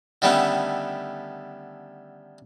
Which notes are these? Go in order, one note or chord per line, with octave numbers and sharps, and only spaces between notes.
D3 D#3 G3 A3 B3 C#4